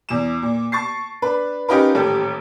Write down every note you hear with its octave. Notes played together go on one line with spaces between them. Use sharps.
E2 E7
A#2
A5 C#6 A6 C7
D4 B4
C#4 D#4 F4 G4 A#4 B4
D#1 A1 G4 A4